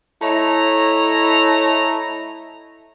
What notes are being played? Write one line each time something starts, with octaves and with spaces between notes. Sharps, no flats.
A3 E4 C#5 D#5 A#5